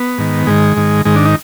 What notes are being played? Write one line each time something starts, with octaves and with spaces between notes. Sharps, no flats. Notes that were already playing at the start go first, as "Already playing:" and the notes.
Already playing: B3
G#2 D#3
G#2 D#3 G#3
G#2 D#3
G#2 D#3 G#3
D4
D#4